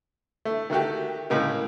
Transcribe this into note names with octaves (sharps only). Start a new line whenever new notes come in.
A3
D#3 A3 F#4 G4
A2 C#3 G#3 A#3